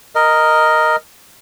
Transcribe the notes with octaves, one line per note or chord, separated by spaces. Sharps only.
A#4 D#5